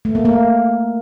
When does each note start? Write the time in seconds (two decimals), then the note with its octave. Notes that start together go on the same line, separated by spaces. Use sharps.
0.05 A3
0.15 A#3
0.25 A#3